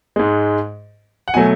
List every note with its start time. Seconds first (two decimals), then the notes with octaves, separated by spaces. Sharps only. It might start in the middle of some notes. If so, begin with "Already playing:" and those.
0.16 G#2 G#3
1.28 F#5
1.34 B2 F#3 A3 G#5